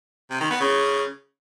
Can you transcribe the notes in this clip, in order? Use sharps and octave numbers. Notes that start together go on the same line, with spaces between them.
C3
D#3
B3
C#3